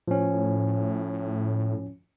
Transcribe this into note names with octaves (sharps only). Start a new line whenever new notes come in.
A2 F3 C#4